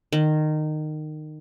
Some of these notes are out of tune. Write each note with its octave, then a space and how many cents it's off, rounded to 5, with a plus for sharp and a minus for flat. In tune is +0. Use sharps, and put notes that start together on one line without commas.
D#3 -20